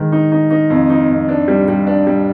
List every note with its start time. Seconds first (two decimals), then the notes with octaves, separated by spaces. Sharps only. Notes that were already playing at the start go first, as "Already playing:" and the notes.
Already playing: D#3 G#3
0.12 D#4
0.32 D#4
0.51 D#4
0.70 F2
0.90 D#4
1.09 F2
1.29 D4
1.48 G3
1.68 G3
1.87 D4
2.07 G3